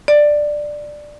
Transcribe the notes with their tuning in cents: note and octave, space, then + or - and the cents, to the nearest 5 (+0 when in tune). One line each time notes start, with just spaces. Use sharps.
D5 +10